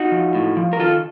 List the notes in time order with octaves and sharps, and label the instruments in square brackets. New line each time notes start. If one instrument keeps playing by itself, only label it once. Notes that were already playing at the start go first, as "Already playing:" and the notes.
Already playing: [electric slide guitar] D#4 F#4
F3
A2
F3
A#4
D#3 F4 A4